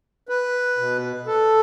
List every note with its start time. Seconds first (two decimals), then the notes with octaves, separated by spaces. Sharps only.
0.29 B4
0.78 B2
1.26 A4